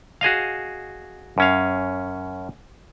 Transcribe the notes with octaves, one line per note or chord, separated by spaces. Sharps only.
F#4 G#4 D#5 F5
F#2 C#4 F5